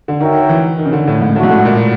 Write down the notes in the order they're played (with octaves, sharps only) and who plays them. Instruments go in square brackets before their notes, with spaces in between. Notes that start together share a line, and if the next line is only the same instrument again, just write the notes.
[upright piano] D3
[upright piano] D#3 [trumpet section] F#4 A#4 C#5 E5 G5
[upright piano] E3
D#3
C#3
D3
A2
G#2
[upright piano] A2 [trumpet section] A3 D4 F#4
[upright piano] G#2
A2
A#2